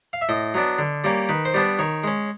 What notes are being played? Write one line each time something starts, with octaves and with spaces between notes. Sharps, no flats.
F5
E5
A2 D#5
F#3 B3 D4
D3
G3 A#3 C#4
D#3 B4
C5
G3 B3 D4
D#3 C#5
G#3 C#4